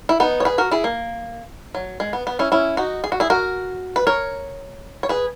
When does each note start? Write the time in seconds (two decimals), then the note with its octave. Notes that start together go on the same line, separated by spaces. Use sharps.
0.09 E4
0.20 B3 D#4
0.40 C#5
0.45 G#4 B4
0.58 F#4 A#4
0.71 E4 G#4
0.84 A#3
1.75 F#3
2.00 G#3
2.13 B3
2.27 B3
2.39 C#4 E4
2.52 C#4 E4
2.77 D#4 F#4
3.04 G#4
3.12 F#4
3.20 E4 G#4
3.30 F#4 A#4
3.96 B4
4.07 A#4 C#5
5.03 C#5
5.09 G#4 B4